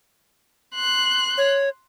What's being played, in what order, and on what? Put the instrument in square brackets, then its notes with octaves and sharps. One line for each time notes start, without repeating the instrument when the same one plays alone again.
[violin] C6 F#6
[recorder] C#5